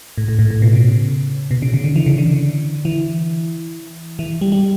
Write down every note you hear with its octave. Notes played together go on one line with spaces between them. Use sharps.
A2
A2
A2
A2
B2
C#3
B2
C#3
C#3
D3
E3
C#3
D3
E3
E3
G3
G3